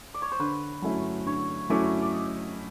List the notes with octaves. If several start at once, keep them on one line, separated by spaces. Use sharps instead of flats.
D5
C#5
C5
D3 B4
F#3 A3 C#4 E4
D3 C#5
F#3 A3 C#4 E4 D5
D5
D#5